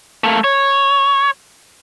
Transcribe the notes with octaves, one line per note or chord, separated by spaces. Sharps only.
A3 A#3
C#5